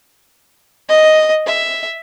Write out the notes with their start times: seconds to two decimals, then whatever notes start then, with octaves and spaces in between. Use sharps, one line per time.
0.89 D#5
1.46 E5